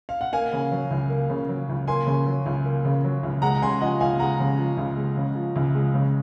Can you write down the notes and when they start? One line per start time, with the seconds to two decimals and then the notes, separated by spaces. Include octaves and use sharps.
0.09 F5
0.21 F#5
0.33 A#3 F5 G#5
0.53 C#3
0.72 F#3
0.91 C#2
1.10 A#3
1.29 C#3
1.49 F#3
1.69 C#2
1.88 A#3 G#5 C6
2.06 C#3
2.26 F#3
2.46 C#2
2.65 A#3
2.85 C#3
3.04 F#3
3.23 C#2
3.42 G#3 F#5 A#5
3.62 C#3 G#5 C6
3.81 F3 D#5 F#5
4.00 C#2 F5 G#5
4.20 G#3 F#5 A#5
4.40 C#3
4.59 F3
4.77 C#2
4.97 G#3
5.17 C#3
5.35 F3
5.56 C#2
5.75 G#3
5.94 C#3